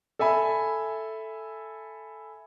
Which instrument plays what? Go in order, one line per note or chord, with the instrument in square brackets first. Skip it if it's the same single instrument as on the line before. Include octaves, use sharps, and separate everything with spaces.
[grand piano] A4 E5 G#5 B5